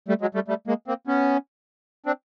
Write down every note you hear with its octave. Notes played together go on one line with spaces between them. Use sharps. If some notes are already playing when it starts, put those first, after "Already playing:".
G3 A3
F#3 G#3
G3 A3
G3 A3
G#3 A#3
A#3 C4
B3 C#4
C4 D4